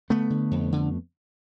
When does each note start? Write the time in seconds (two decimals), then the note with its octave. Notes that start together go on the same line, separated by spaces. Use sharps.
0.10 D3 A3 B3
0.30 D3
0.51 F2
0.72 D3